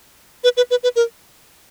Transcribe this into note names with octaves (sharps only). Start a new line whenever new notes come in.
B4
B4
B4
B4
A#4